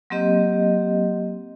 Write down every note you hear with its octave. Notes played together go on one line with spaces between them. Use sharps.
F#3 A#3 C4 G4 D#5